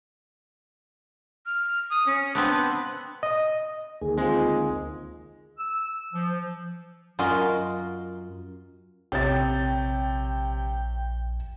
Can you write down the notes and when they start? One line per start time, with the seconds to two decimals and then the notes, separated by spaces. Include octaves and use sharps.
1.46 F6
1.90 D#6
2.06 C#4
2.35 B3 C4 D4 B5
3.23 D#5
4.01 D2 D#3 A#3 G#4
4.18 G#3 C4 F4
5.58 E6
6.14 F3
7.19 F#2 F4 F#4 A#4 D#5 C6
9.12 A#1 C3 C#5 G5 A6